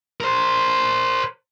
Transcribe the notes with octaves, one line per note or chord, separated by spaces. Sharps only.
A#4 C5